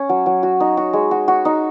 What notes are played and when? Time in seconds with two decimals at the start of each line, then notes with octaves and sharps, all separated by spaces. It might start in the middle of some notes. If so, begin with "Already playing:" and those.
Already playing: C#4
0.09 F#3
0.26 F#3
0.43 F#4
0.60 D#4
0.77 F#4
0.93 G#3
1.11 F#4
1.28 F#4
1.45 D#4